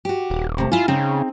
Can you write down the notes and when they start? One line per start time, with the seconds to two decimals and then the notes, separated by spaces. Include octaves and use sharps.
0.05 F#4 G4
0.30 D#1
0.58 C3 A3
0.72 E4 F4 G#5
0.88 C#3 C4 D#4 G#4